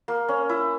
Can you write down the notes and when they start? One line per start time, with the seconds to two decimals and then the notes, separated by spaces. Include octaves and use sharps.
0.08 A#3
0.29 C#4
0.49 E4